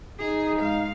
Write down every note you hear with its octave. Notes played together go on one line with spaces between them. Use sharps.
D#4 G#4
G#2 G#3 F5